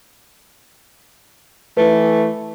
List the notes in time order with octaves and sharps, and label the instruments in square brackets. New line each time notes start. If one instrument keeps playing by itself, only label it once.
[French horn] E3 [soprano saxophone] A3 [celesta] B4